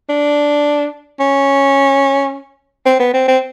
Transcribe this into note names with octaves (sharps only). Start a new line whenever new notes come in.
D4
C#4
C4
B3
C4
C4